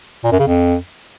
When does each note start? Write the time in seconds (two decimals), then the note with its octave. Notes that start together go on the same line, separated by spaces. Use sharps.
0.24 A#2
0.32 F#2
0.39 C#3
0.47 F2